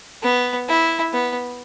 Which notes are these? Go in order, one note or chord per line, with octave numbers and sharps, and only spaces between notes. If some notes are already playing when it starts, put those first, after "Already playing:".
B3
E4
B3